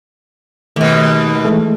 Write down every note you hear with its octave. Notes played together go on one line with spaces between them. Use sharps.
D#2 B2 A3
E3 G#3 A3